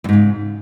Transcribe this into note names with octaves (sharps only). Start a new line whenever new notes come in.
E2 G#2 C#3